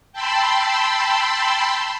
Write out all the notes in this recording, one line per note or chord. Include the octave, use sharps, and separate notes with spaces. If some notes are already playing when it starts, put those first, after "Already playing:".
G5 A5 B5 C6 E6